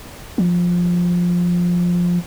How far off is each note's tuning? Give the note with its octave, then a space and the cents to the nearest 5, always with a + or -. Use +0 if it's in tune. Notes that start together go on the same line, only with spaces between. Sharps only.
F3 +10